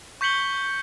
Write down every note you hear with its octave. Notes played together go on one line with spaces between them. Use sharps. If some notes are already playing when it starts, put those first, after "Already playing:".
C#6 G6 B6 C#7 F#7 G7